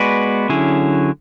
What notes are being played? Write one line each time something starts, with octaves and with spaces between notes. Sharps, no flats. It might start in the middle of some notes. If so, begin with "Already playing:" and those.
Already playing: G#3 B3 F#4 B4 D5
D3 F#3 C#4 E4 G#4